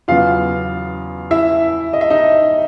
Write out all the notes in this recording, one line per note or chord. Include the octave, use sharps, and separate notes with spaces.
E2 C#3 F#3 B3 F4 F5
E4 E5
D#5
E5
D#4 D#5